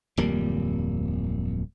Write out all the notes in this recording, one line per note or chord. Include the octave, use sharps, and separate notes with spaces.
D1 F2 G3 A#3